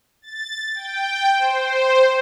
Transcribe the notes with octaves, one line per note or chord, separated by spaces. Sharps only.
A6
G5
C5